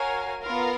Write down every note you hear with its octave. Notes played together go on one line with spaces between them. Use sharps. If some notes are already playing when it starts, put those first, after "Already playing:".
Already playing: F#4 A#4 C#5 F5 G#5
B3 F4 A#4 F5